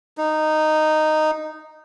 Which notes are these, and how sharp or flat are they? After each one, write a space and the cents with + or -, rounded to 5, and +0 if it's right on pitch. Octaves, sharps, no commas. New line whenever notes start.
D#4 -10